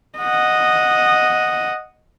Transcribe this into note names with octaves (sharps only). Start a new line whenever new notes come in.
D#5 F#5